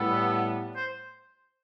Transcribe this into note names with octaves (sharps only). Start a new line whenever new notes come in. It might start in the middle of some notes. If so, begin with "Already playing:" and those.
Already playing: A2 G3 B3 A4
C5